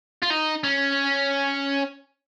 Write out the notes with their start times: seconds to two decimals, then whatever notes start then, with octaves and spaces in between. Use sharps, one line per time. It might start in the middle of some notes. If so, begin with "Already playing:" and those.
0.22 F4
0.30 D#4
0.64 C#4